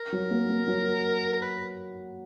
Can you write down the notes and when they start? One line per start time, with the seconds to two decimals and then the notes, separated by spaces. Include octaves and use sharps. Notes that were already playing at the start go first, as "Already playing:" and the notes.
Already playing: A#4
0.12 F#3
0.31 A#3
0.49 A#3
0.68 F#3
1.33 A#4
1.41 B4